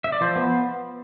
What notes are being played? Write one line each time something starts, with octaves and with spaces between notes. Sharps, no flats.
E5
D5
F3 C5
B3